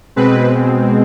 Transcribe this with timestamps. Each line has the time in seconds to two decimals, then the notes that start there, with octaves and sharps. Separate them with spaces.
0.16 B2 G#3 C4 B4